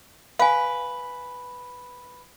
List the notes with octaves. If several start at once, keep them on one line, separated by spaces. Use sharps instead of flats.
B4 F5 G#5